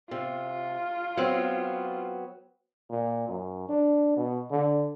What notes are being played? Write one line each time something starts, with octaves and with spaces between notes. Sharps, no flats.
C3 F4
F#3 B3 C4
A#2
F#2
D4
B2
D3